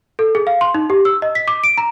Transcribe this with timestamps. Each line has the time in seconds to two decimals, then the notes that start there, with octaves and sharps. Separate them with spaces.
0.19 A4
0.35 G#4
0.47 F5
0.61 C6
0.74 D#4
0.90 G4
1.05 E6
1.22 D#5
1.35 B6
1.48 D6
1.64 D7
1.78 A#5